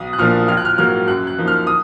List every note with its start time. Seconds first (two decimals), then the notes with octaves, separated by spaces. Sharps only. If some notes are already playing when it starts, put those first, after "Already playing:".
Already playing: B1 D#6
0.13 F#6
0.18 A#2 F3 A#3 D4 F6
0.48 A#1 F6
0.57 F#6
0.65 F6
0.78 G#2 F#3 A#3 F6
1.08 F#2 F#6
1.27 F#6
1.38 F3 A#3 D#4
1.48 F6
1.67 D#6